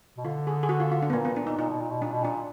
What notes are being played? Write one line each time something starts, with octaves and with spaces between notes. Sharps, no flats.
B2
D3 F4
G#4
G#4
F#4
F4
F4
D4
B3
A#2 A#3
B3
D4
D#4
A#2 D#4
B2
A#2
B2
A#2 D4
B2
A#2 D4